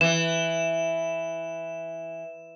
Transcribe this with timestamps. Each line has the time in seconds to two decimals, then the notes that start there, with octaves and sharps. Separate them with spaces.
0.01 E3 E7